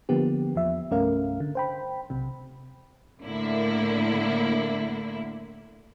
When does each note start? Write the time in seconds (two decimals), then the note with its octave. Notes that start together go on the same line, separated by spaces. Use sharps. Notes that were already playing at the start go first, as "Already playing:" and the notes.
0.09 D3 F3 A#3 B3 G4
0.56 E2 F3 E5
0.91 C2 G2 A3 C#4 A#4 F5
1.40 D3
1.55 C5 G5 B5
2.10 B1 C3
3.21 A2 D3 A#3 E4